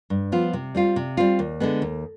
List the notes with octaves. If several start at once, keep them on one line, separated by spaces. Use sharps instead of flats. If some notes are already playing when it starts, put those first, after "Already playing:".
G2
F3 B3 F4
C3
G3 C4 F4
C3
G3 C4 F4
D#2
D3 G#3 B3
D#2